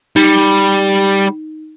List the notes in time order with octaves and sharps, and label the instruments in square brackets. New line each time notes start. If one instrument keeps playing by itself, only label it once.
[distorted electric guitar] G3 [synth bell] D#4